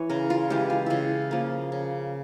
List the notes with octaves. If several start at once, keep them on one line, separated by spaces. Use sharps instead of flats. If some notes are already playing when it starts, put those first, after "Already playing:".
Already playing: E3 C#5
C#3 A#4
F4
E3 G#3 G4
F4
C#3 E4 F4
F3 A#3
C#3